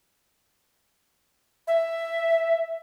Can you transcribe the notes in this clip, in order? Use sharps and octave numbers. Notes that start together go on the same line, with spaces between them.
E5